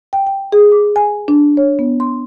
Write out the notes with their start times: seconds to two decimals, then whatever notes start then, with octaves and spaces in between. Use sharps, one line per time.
0.13 G5
0.27 G5
0.52 G#4
0.72 D6
0.96 G#5
1.28 D4
1.57 C#5
1.79 B3
2.00 C6